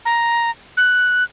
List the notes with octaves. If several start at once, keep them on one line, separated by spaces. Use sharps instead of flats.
A#5
F#6